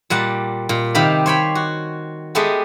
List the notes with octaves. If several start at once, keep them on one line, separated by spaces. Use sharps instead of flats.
A#2 G3 F#5 A5
A#2
C3 D#3 G4 F5 B5
C5 C#5 G5 B5
F#4
G#3 A3 B3 G4